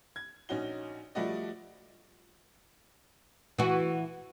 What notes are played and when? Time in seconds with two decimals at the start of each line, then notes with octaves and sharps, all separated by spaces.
0.16 G#6
0.49 A#1 C#4 D#4 F#4 G7
1.15 F3 G3 A3 F#4 D5 D#5
3.59 E3 F#4